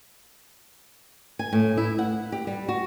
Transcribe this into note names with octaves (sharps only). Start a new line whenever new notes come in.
G#5
A2
E4
F#5
G4
G3
F#4